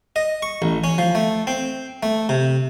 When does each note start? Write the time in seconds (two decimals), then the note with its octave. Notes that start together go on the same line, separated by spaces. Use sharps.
0.16 D#5
0.42 C#6
0.62 A1
0.84 C#4
0.98 F3
1.15 A3
1.47 C4
2.03 A3
2.29 C3